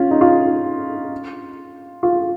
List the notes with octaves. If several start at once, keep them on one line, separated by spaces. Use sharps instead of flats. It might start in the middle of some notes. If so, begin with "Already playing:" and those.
Already playing: C#4 F4
D#4
F4
F4